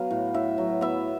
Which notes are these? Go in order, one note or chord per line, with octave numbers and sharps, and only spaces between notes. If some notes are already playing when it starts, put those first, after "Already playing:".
Already playing: F#3 B3 F5
A2
A2 E5
F#3
B3 E5